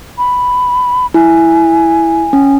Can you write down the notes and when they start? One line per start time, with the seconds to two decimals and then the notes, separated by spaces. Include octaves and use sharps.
0.18 B5
1.14 E4 G#5
2.33 C#4